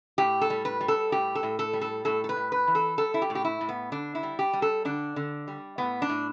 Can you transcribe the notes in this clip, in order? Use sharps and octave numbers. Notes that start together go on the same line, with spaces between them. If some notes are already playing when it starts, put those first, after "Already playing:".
A2 G4
A4
G3
B4
G3
A4
A2 G4
A4
A2
A4
G3
A4
A2 A4
A4
B4
A2
B4
E3
A4
G3 A4
E4
G4
A2
G4
E4
A2
B3
D3 D4
E4
G3
G4
G3
A4
D3 D4
D3
G3
A2 B3
D4
A2